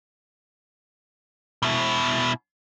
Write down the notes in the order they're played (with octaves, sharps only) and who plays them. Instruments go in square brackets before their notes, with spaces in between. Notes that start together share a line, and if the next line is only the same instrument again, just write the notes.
[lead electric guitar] B2 E4